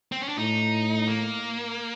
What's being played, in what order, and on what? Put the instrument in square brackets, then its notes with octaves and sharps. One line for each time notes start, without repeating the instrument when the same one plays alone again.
[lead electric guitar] C4
C#4
D4
[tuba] A2 [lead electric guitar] D#4
[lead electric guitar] A#3